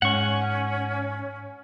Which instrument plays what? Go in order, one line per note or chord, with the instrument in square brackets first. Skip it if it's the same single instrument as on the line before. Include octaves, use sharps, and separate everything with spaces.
[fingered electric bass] G#2 [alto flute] C#4 [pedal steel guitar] F#5 C#6